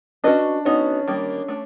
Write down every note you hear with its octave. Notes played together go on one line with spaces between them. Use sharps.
C#4 D4 F#4 B4 D#5
B3 C#4 D#4 F#4
D#3 G3 A#3
A3 D4